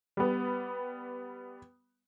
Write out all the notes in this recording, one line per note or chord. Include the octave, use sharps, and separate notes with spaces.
G3 B3